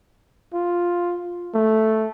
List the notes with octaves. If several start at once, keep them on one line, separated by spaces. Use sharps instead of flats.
F4
A3